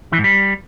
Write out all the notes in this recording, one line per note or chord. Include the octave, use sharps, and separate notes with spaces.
E3
G#2
G3